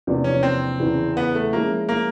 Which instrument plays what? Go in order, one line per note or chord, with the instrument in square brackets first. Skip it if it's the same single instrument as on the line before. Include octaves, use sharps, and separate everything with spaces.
[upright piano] E2 C3 F3 A#3 D4
[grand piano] C#4
C4
[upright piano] E2 C#3 E3
[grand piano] B3
A3
[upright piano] F3 G#3 C#4 E4 G#4 [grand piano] A#3
[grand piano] A#3